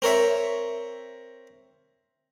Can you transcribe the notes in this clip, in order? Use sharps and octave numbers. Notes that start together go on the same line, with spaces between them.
C4 A#4 C#5 E5